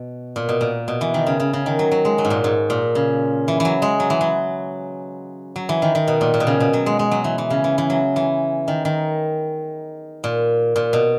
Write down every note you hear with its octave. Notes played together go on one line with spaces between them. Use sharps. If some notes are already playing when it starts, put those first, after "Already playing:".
Already playing: B2
A#2
B2
A#2
B2
E3
D#3
C#3
C#3
C#3
D#3
F#3
F#3
G#3
F#3
G#2
A#2
G#2
A#2
C#3
E3
E3
F#3
G#3
F#3
E3
F#3
F#3
E3
D#3
D#3
B2
A#2
A#2
B2
C#3
B2
F#3
G#3
G#3
F#3
E3
E3
C#3
E3
E3
F#3
E3
D#3
D#3
A#2
A#2
B2